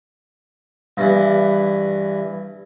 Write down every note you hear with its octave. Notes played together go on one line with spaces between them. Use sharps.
G2 E3